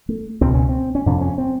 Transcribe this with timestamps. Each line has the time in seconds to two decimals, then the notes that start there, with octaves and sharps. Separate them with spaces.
0.09 A3
0.41 C#2 B2 C4
0.54 C#4
0.69 C4
0.95 C#4
1.06 F2 C3 D4
1.21 C#4
1.38 C4